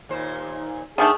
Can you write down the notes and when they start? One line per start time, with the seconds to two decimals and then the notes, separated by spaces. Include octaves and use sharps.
0.09 D#2 A#2 C5
0.98 D3 D#3 A3 G#4 A5